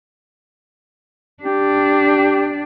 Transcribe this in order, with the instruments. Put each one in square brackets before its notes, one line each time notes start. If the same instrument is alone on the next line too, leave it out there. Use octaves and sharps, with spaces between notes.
[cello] D4 [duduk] G4